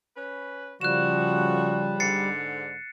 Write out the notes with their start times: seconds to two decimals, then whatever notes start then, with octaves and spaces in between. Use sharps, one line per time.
0.17 C#4 B4
0.81 C#3 F3 G3 F#4 F#6 E7
2.00 G#2 D3 A6 C7 C#7